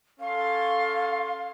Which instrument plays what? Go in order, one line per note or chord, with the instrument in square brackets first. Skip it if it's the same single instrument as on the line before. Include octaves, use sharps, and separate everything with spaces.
[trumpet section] C#4 A4 C6 [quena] F5